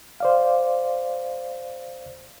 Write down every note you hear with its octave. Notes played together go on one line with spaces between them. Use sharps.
C5 D5 F5